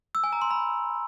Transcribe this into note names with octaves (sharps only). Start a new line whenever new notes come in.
E6
G#5
A#5
C6
B5